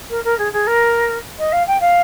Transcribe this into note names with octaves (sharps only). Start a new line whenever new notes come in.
A#4
A#4
G#4
G#4
A#4
D#5
F5
G5
F5